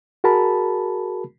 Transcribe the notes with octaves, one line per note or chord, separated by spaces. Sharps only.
F#4 G#4 A#4 A5 B5